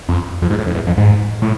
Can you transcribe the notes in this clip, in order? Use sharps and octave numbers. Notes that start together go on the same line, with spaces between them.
F2
F2
G#2
A2
F2
E2
F2
G#2
A2